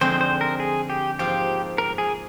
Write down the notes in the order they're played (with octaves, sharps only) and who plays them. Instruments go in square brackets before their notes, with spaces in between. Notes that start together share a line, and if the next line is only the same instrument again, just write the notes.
[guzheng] F2 D3 G#3 C4 D#4 [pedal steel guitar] C5
[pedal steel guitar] C5
A#4
G#4
G4
[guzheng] G#2 F3 A#3 F4 [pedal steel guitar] G4
[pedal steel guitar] A#4
G#4